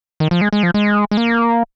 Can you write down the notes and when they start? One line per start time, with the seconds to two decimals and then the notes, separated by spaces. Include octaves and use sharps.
0.20 D#3
0.31 F3
0.41 G#3
0.53 G#3
0.63 F3
0.74 G#3
1.11 G#3
1.17 A#3